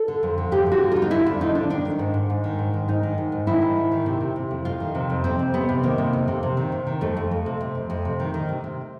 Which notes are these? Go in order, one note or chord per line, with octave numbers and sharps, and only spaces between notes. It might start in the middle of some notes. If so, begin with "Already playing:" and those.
Already playing: A4
D3
F2
D3
F2 G4
F2
F#4
D3
D3 F4
D#4
D3 E4
F2 D4
D3 D#4
D3 D4
D#3 D4
D#3
G#2
G#2
G#2
D#3
G#2
D#3
G#2 D#4
D#3
G#2
G#2
D#3 E4
G#2
D#3
D#3
C3
C3
C3
F2
F2 F4
D#3
C3
F2
C3 C4
F2
C3 B3
C3
D#3 A#3
C3
F2
C3
C3
D#3
C3
D#3
F2 A3
F2
F2
C3
C3
F2
F2
C3
D#3
D#3
C3
C3